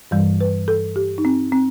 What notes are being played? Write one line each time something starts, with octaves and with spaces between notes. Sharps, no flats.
G2 E3 G3
B4
A4
G4
D#4
C4
C4